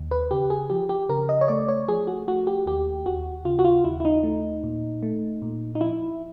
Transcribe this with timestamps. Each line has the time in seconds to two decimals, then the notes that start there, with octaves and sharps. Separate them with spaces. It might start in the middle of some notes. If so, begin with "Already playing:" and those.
Already playing: D#2
0.11 B4
0.31 C#3 G4
0.50 G#4
0.70 F3 G4
0.89 G4
1.09 C#3 A#4
1.29 D#5
1.41 C#5
1.48 A3 D5
1.68 C#5
1.88 F3 G#4
2.07 F#4
2.28 A3 F#4
2.47 G4
2.66 D#2 G4
3.06 D#2 F#4
3.45 C#3 F4
3.59 F#4
3.65 F4
3.84 D#2 E4
4.00 E4
4.05 D#4
4.23 A3
4.63 A#2
5.02 A3
5.42 A#2
5.75 D#4
5.81 F3 E4